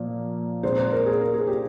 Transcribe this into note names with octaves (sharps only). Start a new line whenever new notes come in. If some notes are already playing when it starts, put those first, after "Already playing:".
Already playing: A#2 F3 A#3
A#2 G#3 C4 C5
C5
A#4
G#4
A#4
G#4
G4